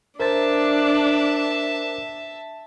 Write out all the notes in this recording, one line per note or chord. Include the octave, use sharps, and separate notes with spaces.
D4 A#4 C5 E5 A5 A6